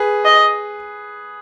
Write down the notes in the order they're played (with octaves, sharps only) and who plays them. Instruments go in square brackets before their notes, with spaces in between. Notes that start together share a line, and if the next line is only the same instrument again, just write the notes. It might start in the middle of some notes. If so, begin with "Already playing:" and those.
Already playing: [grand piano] G#4 B4
[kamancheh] D#5